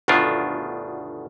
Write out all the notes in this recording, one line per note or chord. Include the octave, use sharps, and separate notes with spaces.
G1 D2 B2 D#3 D4 F4